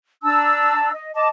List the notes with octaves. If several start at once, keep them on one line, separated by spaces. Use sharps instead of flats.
D4 A5 A#5 E6
D#5
D#5 A5 D6